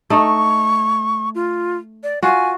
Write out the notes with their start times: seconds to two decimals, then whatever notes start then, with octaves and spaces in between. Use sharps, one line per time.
0.10 A3 D#4 C#6
1.35 F4
2.03 D5
2.23 F4 F#4 G#5